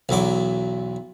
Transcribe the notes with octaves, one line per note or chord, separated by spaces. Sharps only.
B1 E2 F#3 D6